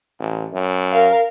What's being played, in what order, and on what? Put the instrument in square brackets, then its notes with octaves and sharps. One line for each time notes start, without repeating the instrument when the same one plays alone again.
[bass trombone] A1
F#2
[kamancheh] A#4 F5